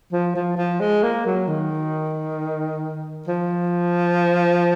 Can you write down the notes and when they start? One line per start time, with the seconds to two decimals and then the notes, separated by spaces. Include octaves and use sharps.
0.12 F3
0.35 F3
0.57 F3
0.80 G#3
1.03 A#3
1.26 F#3
1.47 D#3
3.27 F3